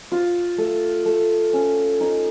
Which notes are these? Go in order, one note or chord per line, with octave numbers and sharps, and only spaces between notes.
F4
A3
A3
C#4
D#4